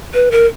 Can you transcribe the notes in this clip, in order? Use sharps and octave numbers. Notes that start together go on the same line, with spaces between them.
B4
A#4